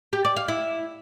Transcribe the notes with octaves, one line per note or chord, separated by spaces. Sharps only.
G4
D5
F5
E4